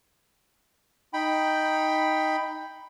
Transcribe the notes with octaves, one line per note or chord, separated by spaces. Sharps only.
D#4 G5 B5